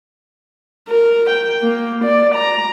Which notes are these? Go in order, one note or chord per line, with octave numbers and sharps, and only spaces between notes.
A#4
G5
A#3
D5
A#5